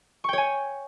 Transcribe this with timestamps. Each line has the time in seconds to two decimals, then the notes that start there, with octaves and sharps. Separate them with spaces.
0.24 C#6
0.29 G5
0.33 C#5
0.38 G#5